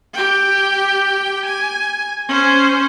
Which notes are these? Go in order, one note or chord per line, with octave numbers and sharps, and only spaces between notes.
G4 G5
G#5
C#4 C5